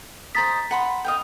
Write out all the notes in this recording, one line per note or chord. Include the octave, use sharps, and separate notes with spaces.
C5 D#5 A#5 A6 B6
F#5 B5 C6
D#5 F5 G5